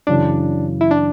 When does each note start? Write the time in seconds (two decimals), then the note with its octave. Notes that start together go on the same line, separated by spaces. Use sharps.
0.07 F#2 C#3 E3 D4
0.81 E4
0.91 D4